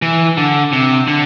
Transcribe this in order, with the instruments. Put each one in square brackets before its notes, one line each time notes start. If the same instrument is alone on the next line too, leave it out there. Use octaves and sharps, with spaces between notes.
[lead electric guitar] E3
D3
C3
D3